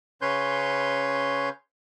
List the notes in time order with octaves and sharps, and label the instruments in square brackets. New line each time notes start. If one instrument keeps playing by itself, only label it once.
[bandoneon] C#3 C#4 B4 C#5 C6 G6